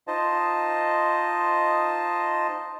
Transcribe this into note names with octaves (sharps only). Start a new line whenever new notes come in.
D#4 F4 C5 D#5 A5